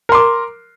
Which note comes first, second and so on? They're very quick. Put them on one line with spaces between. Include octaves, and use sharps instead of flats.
A#4 C6 D6